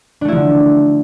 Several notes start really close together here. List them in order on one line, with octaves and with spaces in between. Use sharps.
D4 A3 E4 F3 D3